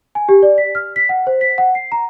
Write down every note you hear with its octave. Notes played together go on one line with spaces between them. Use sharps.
G#5
G4
D5
B6
F6
B6
F#5
C5
B6
F#5
C7
A#5